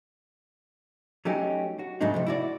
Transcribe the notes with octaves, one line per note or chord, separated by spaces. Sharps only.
F#3 A3 C#4 D#4 G4
F#4
G#2 C#3 F#3 A3 D4 D#4
C3 F3 A3
E4 F#4 D5